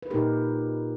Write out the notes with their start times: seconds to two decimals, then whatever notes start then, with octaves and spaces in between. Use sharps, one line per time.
0.03 B4
0.10 A#2 A#3 D#4 G4 A#4